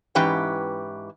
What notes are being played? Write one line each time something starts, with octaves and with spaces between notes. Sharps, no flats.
G#2 E3 C#4 G4 B4 G5